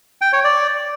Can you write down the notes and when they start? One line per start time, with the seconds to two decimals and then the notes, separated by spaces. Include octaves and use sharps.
0.21 G5
0.33 C#5
0.44 D5